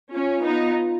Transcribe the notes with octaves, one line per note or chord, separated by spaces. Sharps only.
C#4 F4
B3 D#4